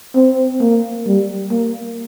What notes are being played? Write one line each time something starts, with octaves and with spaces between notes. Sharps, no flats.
C4
A#3
G3
A#3